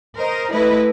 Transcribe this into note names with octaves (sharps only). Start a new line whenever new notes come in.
A#4 C5 D#5
A3 E4 B4 D#5